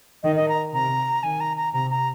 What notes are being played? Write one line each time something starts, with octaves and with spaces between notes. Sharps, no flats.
D#3 D#5
D#5
A#5
C3 A#5
D#3 G#5
A#5
A#5
C3 A#5
A#5